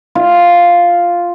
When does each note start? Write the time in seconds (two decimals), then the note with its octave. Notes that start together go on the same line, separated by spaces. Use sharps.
0.15 F4